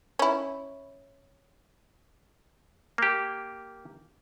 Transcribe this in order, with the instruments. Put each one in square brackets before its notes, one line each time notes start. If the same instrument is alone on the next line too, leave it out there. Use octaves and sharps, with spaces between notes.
[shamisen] C#4 E4
[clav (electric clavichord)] A#3 G4